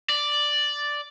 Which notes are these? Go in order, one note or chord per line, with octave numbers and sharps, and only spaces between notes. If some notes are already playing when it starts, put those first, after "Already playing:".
D5